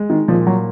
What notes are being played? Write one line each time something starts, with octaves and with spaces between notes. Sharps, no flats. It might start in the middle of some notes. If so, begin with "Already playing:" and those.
Already playing: G#3
D#3
A#2 F3
F#3